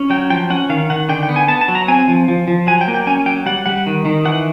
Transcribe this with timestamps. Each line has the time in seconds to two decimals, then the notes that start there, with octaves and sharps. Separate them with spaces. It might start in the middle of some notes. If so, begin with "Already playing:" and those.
Already playing: C#4
0.10 F#3 G5
0.30 F3 G5
0.50 C#4 F#5
0.69 D#3 F5
0.90 D#3 F#5
1.09 D3 G5
1.23 G5
1.29 B3
1.36 G#5
1.48 B3 A5
1.61 A5
1.68 F#3
1.75 A#5
1.88 C4 G#5
2.08 F3
2.28 F3
2.48 F3
2.67 F#3 G#5
2.81 G5
2.88 A#3
2.94 G5
3.07 C#4 G#5
3.26 F#3 G5
3.46 G3 F#5
3.66 G3 F#5
3.87 D#3
4.05 D#3
4.25 E3 F#5